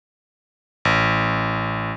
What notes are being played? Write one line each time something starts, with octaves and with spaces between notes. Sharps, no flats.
A1